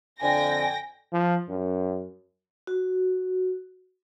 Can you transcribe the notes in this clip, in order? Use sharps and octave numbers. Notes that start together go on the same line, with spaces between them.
F2 D3 G5 G#5 A#6
F3
F#2
F#4